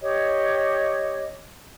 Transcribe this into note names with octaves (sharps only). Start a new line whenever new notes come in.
G4 C#5 D#5